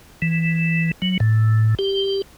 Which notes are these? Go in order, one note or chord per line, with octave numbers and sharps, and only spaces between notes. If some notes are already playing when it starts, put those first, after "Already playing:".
E3
F#3
A2
G4